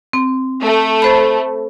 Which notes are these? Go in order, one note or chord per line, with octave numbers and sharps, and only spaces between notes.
C4
A3
A4 C5 B5